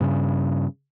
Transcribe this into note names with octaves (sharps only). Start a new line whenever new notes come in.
G2 C#3